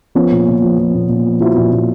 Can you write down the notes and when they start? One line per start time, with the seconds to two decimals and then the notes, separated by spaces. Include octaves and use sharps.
0.15 F3 B3 C#4
0.32 A#2
0.47 A#2
0.62 F3
0.78 F3
0.94 A#2
1.09 A#2
1.25 F3
1.40 F3 E4 F#4
1.57 A#2
1.72 A#2